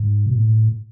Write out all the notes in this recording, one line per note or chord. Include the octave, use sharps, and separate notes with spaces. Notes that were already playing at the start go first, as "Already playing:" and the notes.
Already playing: G#2
B2
A2